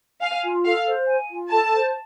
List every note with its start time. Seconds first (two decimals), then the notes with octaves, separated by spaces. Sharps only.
0.22 F5 G#5
0.43 F4
0.65 A4 F5
0.87 C5
1.07 G#5
1.30 F4
1.51 A4 A5
1.73 C5